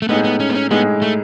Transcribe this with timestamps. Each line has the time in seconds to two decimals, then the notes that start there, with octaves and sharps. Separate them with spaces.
0.02 A3
0.09 A2 G#3 B3 D#4 G#4
0.24 B3
0.40 C#4
0.49 B3
0.55 C#4
0.71 A2 G#3 B3 D#4 G#4
1.02 A3